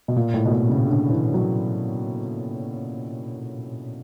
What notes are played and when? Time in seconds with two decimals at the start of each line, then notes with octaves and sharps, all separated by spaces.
0.08 B2
0.16 A#2
0.34 A2
0.45 B2
0.51 A#2
0.69 C#3
0.87 D3
1.10 E3
1.34 F#3